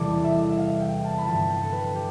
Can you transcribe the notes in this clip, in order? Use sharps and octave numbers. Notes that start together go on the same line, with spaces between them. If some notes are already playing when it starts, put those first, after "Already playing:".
Already playing: E2 C3 E3 G3 A4 D5
E5
E5
F5
G5
A5
B5
G2 D3 F3 A5
G5
A4
B4
G4